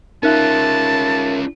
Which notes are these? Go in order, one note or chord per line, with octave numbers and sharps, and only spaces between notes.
C#4 D#4 F4 A#4 E5 A5 F#6